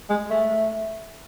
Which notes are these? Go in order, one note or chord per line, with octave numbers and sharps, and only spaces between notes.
G#3
A3